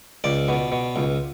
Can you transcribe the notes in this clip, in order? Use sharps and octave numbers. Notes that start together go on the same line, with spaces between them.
C#2 D5
B2
B2
C#2